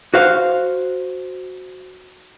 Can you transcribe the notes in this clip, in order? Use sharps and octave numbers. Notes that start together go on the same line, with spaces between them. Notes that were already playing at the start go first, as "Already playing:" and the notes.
F#4 C5 F5